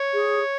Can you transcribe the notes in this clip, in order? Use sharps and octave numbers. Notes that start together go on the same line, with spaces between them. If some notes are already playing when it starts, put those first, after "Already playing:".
Already playing: C#5
G#4